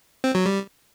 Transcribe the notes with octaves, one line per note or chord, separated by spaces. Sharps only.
C4
F#3
G3